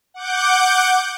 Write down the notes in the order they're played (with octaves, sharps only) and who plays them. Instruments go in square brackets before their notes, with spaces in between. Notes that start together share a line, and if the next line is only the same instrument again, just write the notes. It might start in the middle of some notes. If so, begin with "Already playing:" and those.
[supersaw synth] F#5 D6 G6